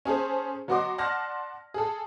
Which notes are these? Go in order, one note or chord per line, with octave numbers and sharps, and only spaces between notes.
C#4 G#4 A4 C5
F#3 B3 F#4 D#5 C6 D6
D5 F#5 A5 C6 F6 A#6
G#4 A4